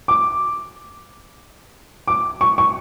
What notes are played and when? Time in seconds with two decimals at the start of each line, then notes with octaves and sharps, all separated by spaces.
0.08 D6
2.08 D6
2.41 C#6
2.58 C#6